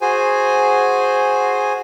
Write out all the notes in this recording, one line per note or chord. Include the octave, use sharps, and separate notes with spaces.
F#4 G#4 C5 G#5